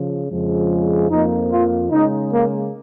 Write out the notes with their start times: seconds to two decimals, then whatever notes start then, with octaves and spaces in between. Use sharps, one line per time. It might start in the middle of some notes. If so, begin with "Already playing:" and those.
Already playing: C#3 F3
0.28 F2 C#3 F3 G#3
1.08 F2 F3 A#3 D#4
1.50 F4
1.90 C#3 G#3 D#4
2.32 A#3